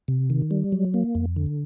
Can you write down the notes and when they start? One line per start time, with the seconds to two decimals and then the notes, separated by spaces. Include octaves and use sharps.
0.08 C3
0.30 D#3
0.51 G3
0.72 F#3
0.94 A#3
1.15 F2
1.36 D3